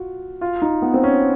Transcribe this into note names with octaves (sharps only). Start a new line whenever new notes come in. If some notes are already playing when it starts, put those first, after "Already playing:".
Already playing: F4 F#4
F4
D#4
B3
C4
C#4